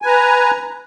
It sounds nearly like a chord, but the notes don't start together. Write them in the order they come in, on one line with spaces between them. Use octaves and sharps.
G#5 B4 A#5